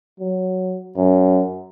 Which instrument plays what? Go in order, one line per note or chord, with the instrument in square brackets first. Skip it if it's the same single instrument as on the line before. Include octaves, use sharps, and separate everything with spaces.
[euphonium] F#3
F#2